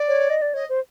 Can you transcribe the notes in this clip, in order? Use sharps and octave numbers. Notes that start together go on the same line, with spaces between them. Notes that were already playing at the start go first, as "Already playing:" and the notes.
Already playing: D5
C#5
D#5
D5
C#5 D#5
C5